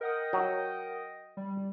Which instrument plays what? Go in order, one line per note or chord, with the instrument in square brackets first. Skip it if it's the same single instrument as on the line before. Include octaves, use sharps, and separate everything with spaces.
[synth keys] A#4 F#5 D#6 [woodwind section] D#5 G5
[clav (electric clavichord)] F#3
[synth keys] G3